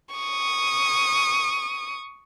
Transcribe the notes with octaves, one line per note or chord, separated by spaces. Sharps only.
C#6 D#6